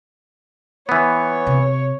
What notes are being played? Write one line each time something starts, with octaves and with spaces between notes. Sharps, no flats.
E3 B3 C#5
C3